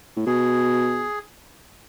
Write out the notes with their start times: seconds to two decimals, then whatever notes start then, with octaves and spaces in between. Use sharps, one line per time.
0.17 A2
0.26 B2 G#4